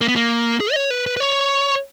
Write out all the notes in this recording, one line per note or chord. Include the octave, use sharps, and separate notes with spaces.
A#3
B3
A#3
G#4
D#5
C#5
B4
B4
B4
C#5